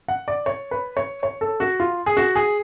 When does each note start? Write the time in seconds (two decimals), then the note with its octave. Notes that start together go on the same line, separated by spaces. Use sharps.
0.08 F#5
0.28 D5
0.46 C#5
0.71 B4
0.97 C#5
1.23 C#5
1.41 A4
1.60 F#4
1.80 F4
2.06 G#4
2.17 F#4
2.35 G#4